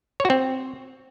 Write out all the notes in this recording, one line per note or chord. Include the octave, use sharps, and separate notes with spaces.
C#5
F#4
C4